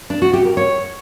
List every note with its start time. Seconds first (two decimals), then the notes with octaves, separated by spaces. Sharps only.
0.10 D4
0.22 F#4
0.33 G4
0.45 A#4
0.57 C#5